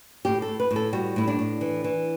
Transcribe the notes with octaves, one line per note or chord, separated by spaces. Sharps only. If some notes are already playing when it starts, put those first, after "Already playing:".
A2 G4
A4
A2
B4
A2
A4
G3 F#4
A2 E4
D4
A2
E3
E3